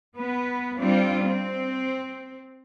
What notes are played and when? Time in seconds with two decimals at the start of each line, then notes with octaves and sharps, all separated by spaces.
0.15 B3 B4
0.78 G3 C4 D4 F4
1.23 C4